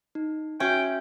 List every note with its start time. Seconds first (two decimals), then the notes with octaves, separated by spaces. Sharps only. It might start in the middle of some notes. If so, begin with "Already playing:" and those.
0.15 D#4
0.60 C#4 F#4 E5 G5